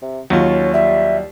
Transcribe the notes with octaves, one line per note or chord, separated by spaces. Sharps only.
C3
D#2 F#3 C#4 F4
G3 E5